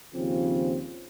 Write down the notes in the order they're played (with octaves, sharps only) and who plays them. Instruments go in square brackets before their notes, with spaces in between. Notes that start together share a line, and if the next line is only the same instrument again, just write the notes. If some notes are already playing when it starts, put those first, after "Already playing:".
[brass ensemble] D#2 C#3 F3 C4 F4